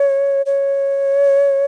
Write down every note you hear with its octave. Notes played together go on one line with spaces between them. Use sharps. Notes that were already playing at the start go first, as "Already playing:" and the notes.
Already playing: C#5
C#5